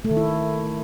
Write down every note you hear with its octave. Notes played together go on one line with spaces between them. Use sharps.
A3
D#3
E4